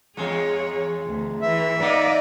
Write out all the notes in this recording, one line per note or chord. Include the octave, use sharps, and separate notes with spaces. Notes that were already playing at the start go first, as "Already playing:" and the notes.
E2 G#3 G#4 C#5
D2
E3 E5
A#3 D#4 D5 D#5